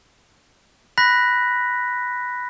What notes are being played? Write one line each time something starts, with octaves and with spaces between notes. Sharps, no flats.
B5 F#6 A#6 B6